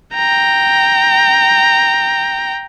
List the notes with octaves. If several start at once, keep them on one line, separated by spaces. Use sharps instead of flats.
G5 A#5